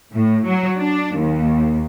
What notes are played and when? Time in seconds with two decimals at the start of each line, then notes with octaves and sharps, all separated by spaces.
0.12 A2
0.46 F#3
0.78 D4
1.19 D#2